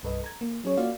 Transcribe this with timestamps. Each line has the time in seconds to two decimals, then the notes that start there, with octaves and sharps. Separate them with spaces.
0.03 C2 G2 A4 B4 D#5
0.24 A#5 G#6
0.41 A#3
0.64 F#3 C#4 G#4 C#5
0.77 A#3 F4 F#4 D5 F5